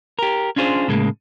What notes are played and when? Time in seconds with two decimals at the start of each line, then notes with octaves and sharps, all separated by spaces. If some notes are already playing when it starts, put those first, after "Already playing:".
0.19 G4 A#4
0.56 C#4 D4 F4 G#4 C5
0.88 A2 C#3 G#3 A#3